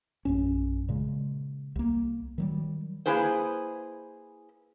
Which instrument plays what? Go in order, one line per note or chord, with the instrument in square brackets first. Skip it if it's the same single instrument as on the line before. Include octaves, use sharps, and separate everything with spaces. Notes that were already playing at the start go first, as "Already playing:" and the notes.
[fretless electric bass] A#1 F#2 C#4
A#2 C#3 G#3
C2 A#3
D#3 F#3 G3
[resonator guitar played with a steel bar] A#3 E4 G#4 B4 C5